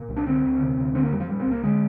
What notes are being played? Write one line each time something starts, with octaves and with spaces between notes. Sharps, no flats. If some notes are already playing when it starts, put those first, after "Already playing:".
Already playing: A#2
C2
D4
D3 C4
D2
C3
D2
D3 C4
A#3
F2 G3
F3
A#2 G3
C4
C2 A#3
D3 G#3